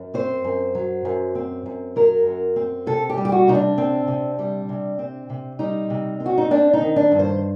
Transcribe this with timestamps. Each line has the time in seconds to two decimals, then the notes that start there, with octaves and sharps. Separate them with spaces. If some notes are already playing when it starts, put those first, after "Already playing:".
Already playing: F#2
0.14 C4 C5
0.44 F#2
0.75 F#3
1.05 F#2
1.35 C4
1.66 F#2
1.96 F#3 A#4
2.26 F#2
2.56 C4
2.87 C3 A4
3.10 G4
3.17 G3
3.25 G4
3.32 F#4
3.48 C3 D#4
3.55 D4
3.78 C4
4.08 C3
4.39 G3
4.69 C3
4.99 C4
5.30 C3
5.59 G3 D#4
5.90 C3
6.20 C4
6.26 F#4
6.38 D#4
6.51 C4 D4
6.73 D#4
6.81 D#3
6.96 D4
7.12 G2
7.19 C5